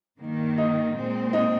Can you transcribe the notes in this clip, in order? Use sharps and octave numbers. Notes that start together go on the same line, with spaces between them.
G2 D#3 A#3
D#4
A#2 G#3 C4
D#4